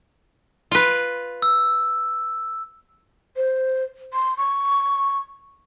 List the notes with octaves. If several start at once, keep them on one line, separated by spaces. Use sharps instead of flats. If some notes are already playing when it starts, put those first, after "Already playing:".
F4 B4
E6
C5
C6
C#6